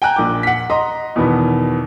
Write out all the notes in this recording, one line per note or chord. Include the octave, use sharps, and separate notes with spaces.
G5 G#5 A#5 F#6
A#1 D6
F#5 B6
D#5 A#5 C6
E2 B2 D#3 B3